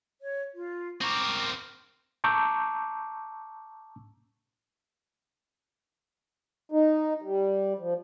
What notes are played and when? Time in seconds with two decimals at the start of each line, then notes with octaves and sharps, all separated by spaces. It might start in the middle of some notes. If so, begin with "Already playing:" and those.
0.21 C#5
0.54 F4
1.01 C4 A#4 C#6 D6
2.24 A5 A#5 C#6 D6 E6 G6
6.72 D#4
7.22 G3
7.79 F3